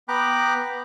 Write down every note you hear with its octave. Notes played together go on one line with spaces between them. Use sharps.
B3 G5 A#5 B5 D6 F#6